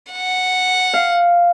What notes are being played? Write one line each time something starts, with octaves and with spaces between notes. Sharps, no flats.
F#5
F5